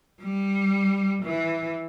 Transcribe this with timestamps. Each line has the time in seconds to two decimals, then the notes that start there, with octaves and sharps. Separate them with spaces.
0.21 G3
1.22 E3